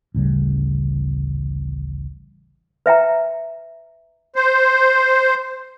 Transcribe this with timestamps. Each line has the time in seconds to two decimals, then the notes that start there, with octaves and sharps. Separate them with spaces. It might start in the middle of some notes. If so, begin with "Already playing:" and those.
0.14 A1 D2 C#3 G3
2.86 B4 E5 G5 A#5
4.36 C5